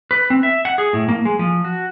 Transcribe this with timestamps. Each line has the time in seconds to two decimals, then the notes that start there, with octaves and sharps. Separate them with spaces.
0.11 B4
0.30 C4
0.43 E5
0.65 F#5
0.78 G#4
0.93 A2
1.09 A#3
1.25 G#3
1.39 F3
1.64 F#4